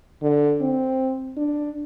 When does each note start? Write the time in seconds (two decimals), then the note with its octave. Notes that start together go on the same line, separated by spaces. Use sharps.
0.22 D3
0.61 C4
1.37 D4